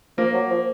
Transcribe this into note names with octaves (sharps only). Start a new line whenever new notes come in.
F3 A#3
F#3
F3